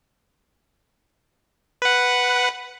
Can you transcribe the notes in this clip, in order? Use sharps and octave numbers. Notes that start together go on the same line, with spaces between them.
B4 F#5